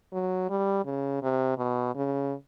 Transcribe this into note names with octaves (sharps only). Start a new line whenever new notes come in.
F#3
G3
C#3
C3
B2
C#3